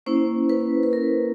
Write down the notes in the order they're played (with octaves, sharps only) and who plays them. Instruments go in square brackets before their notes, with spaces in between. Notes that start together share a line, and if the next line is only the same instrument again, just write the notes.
[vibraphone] A#3 C#4 E4 C5
B4
B4
A#4